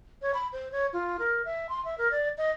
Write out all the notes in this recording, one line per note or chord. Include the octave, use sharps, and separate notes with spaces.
C#5
B5
C5
C#5
F4
A#4
E5
C6
E5
A#4
D5
D#5